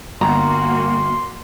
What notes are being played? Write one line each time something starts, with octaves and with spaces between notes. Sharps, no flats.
G1 A#3 F#4 A#5 C6